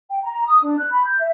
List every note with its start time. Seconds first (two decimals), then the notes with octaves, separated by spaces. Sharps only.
0.09 G5
0.24 A#5
0.46 D#6
0.62 D4
0.77 F#6
0.91 B5
1.05 G6
1.19 E5